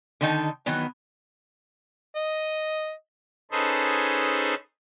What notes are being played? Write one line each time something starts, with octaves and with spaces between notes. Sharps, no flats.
D3 D#3 D#4 A5
D#3 E3 F#3 B3
D#5
C#4 D#4 G#4 A4 B4 C5